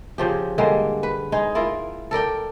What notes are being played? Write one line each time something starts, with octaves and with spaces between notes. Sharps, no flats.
C#3 F3 G4
D3 G3 G#3 A#3
B4
G#3 D#4 G#4
E4 F4 A#4
A4 A#4 D5 G5